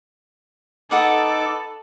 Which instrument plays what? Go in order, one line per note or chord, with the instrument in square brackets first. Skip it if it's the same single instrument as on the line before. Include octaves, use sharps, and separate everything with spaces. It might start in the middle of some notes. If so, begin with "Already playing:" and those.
[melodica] D#4 D6 [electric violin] A4 [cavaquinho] B4 F#5 D#6